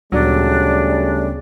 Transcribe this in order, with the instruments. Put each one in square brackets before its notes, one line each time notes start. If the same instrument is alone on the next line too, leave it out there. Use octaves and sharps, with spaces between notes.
[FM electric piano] D2 A#2 B3 [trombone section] C#3 G3 A3 [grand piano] F#3 [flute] D4